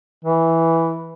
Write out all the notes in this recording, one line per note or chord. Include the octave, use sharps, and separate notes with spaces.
E3